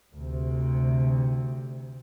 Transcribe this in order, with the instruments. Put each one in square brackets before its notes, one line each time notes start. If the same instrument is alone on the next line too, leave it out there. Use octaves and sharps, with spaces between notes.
[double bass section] D2 C3